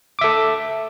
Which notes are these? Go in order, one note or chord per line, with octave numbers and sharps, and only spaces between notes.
A4 E5 D6